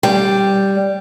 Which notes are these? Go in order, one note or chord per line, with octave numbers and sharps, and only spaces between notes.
G3